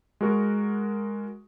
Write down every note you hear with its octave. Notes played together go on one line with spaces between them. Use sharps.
G#3 F#4 A#4 C#6